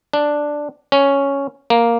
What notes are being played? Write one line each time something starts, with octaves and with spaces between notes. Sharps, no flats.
D4
C#4
A#3